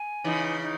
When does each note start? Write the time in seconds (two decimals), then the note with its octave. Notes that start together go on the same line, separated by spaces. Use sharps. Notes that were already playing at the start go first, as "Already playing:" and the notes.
Already playing: G#5
0.24 C#3 E3 D#4
0.62 D#4